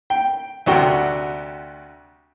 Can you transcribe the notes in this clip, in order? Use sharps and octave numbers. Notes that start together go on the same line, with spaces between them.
G5
D2 C3 F#4 G5